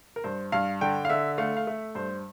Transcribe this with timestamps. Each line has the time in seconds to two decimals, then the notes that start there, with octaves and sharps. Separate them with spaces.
0.16 A#4
0.24 G2 C5
0.52 G2 F5
0.81 D3 G5
1.05 F5
1.09 D3 E5
1.38 A3 F5
1.57 F5
1.67 A3 E5
1.95 G2 C5